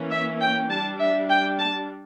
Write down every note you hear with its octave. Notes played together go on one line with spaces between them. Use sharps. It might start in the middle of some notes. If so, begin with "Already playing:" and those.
Already playing: E3 A#3 C#4
E5
G5
G3 D4 A5
E5
G5
A5